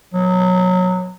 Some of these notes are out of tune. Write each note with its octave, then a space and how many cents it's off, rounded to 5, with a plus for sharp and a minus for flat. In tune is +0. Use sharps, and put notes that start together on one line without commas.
F#3 -15